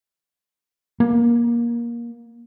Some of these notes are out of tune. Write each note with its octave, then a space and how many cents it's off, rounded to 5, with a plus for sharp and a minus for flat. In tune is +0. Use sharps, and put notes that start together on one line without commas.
A#3 +20